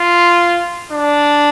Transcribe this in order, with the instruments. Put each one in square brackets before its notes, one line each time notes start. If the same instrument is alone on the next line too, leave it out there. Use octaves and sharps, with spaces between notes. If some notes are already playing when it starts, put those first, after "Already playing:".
Already playing: [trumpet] F4
D4